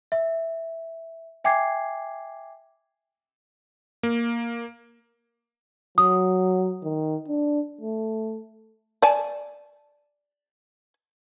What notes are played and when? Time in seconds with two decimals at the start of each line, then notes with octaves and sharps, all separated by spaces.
0.12 E5
1.44 E5 G5 G#5 D6 G#6 C7
4.03 A#3
5.98 F#3 D#6
6.83 D#3
7.28 D4
7.81 A3
9.02 D5 G#5 A5